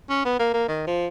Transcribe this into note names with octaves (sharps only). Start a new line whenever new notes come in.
C#4
B3
A#3
A#3
D#3
F3